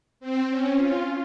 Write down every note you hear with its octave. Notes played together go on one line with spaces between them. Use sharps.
C4
C#4
F4